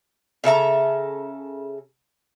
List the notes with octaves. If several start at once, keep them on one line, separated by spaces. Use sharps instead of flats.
C#3 A4 E5 A#5